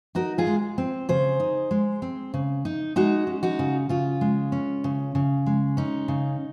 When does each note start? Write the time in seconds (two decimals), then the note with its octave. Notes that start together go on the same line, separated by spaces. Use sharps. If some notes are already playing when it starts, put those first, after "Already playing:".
0.15 D#4 F#4 A#4
0.38 F4 G#4
0.47 G#3
0.78 C4
1.09 C#3 G#4 C5
1.40 D#4
1.71 G#3
2.02 C4
2.34 C#3
2.65 D#4
2.96 G#3 D#4 F#4
3.27 C#4
3.43 D#4 F#4
3.59 C#3
3.89 C#3 F4
4.21 G#3
4.52 C#4
4.84 C#3
5.15 C#3
5.46 G#3
5.77 C#4 D#4
6.08 C#3